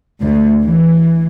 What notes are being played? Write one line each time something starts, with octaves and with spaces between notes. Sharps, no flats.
D2
E3